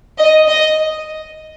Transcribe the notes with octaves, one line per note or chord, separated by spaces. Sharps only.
D#5
D#5